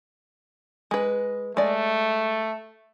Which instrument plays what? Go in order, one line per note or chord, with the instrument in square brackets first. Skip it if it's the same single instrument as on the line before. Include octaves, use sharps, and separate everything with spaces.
[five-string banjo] G#3 B4
[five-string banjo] G#3 D5 [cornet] A3